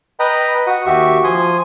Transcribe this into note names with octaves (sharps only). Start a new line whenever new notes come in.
B4 D#5 G5 A#5 B5
F#4 F#5 D#6
D#2 F#4 G4 E5 C#6
F3 G#5 C6 D#6